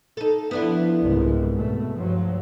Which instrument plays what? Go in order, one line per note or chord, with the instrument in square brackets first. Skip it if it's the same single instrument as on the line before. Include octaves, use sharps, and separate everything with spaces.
[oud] D#4 A4
[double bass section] F3 [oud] B3 D4 E4
[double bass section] F#1 C2 G#2
B2 A3
G2 F3 F#3